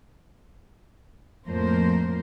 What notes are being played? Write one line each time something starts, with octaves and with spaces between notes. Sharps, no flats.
F2 A2 F3 A#3 A#4 C5